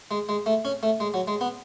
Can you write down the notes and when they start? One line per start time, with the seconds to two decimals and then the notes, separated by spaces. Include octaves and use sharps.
0.11 G#3
0.29 G#3
0.46 A3
0.65 C#4
0.83 A3
1.00 G#3
1.14 F#3
1.28 G#3
1.41 B3